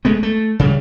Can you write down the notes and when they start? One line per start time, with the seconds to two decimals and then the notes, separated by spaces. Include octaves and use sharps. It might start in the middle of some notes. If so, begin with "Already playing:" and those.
0.05 G#3 A3 B3
0.23 A3
0.59 C#3 G3